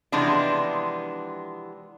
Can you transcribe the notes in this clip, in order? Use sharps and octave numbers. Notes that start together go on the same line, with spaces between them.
C3 E3 F3 G#3 B3 D4